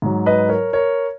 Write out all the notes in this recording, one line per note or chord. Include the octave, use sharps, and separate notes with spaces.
G#2 F#3
B4 D#5
A#4 C#5
A#4 C#5